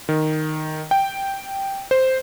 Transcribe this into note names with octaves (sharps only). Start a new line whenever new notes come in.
D#3
G5
C5